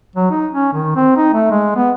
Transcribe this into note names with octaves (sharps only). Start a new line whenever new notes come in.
F#3
D#4
C#4
D#3
C4
D#4
A3
G#3
B3